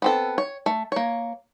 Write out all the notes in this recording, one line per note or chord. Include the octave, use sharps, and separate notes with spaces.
B3 C4 A4
C#5
A3
A#3 C#5